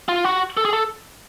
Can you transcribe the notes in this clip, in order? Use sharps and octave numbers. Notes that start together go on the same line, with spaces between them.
F4
F#4
A4
G#4
A4